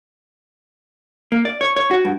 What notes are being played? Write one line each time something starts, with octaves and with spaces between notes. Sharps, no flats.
A#3
D5
C#5
C#5
F#4
G2